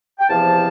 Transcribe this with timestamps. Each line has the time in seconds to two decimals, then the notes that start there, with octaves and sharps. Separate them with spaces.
0.20 G5
0.29 E2 C3 F3 F5 A5